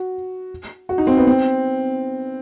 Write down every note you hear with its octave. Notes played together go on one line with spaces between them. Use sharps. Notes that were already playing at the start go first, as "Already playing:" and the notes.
Already playing: F#4
F#4
D#4
C4
B3
C4